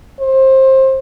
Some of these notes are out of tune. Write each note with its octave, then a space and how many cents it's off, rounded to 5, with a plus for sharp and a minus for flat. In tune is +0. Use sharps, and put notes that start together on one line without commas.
C5 +25